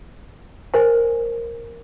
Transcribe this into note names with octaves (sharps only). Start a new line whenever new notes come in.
A#4 C5 G#5